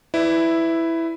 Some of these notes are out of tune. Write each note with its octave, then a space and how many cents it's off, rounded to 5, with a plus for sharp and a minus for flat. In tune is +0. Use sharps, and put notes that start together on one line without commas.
E4 +0 B4 +25 D5 +0